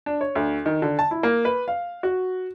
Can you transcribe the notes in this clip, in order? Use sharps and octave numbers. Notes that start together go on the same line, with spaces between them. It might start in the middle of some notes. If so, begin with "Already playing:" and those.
D4
C#5
D2
D#3
D3
A5
E4
A#3
B4
F5
F#4